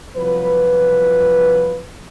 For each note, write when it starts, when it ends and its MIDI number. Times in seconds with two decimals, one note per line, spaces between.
0.16 1.82 36
0.16 1.82 53
0.16 1.82 54
0.16 1.82 65
0.16 1.82 71